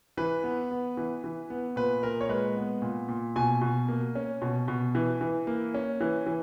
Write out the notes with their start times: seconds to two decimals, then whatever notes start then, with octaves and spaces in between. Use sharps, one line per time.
0.17 E3 B4
0.44 B3
0.71 B3
0.97 E3
1.24 E3
1.50 B3
1.76 A#2 B4
2.03 A#2 A#4
2.21 C#5
2.29 G#3 B4
2.57 B3
2.82 A#2
3.08 A#2
3.36 B2 G#5
3.61 B2
3.88 A#3
4.15 C#4
4.42 B2
4.68 B2
4.95 E3
5.21 E3
5.47 A#3
5.74 C#4
6.01 E3
6.26 E3